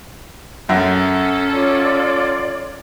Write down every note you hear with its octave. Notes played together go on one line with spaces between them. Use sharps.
F#2 C#4 A4
F4 C#5 D5